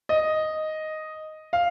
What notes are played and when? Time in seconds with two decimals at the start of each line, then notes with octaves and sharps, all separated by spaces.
0.09 D#5
1.53 F5